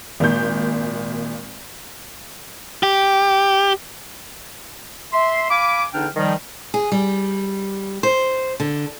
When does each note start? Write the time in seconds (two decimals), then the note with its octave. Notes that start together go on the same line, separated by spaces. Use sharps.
0.20 G#1 A#2 G6
2.83 G4
5.13 E5 C6
5.50 F5 G#5 B5 D6
5.93 E2 D3 D4 D#4 G5 F6
6.16 D#3 F3 G3
6.74 G#4
6.92 G3
8.03 C5
8.60 D3